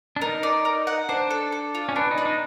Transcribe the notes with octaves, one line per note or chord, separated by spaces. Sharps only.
D4
D#4 A#4
D5
A#4
F#5
D4 C5
A4
A4
F4
C#4
B3 D4
D#4
D4
D#4